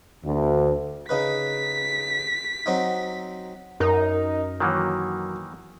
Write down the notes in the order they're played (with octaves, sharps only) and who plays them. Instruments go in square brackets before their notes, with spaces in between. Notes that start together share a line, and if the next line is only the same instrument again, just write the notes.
[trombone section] D2
[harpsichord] C#3 D#4 B4 [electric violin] B6
[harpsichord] F#3 C4 D#4
[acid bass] F#2 [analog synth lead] D#4 [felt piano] A#4
[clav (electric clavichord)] D#3 E3 A#3 [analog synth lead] F#3